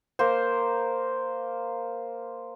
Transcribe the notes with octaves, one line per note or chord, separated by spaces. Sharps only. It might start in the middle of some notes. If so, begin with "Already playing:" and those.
A#3 A#4 C5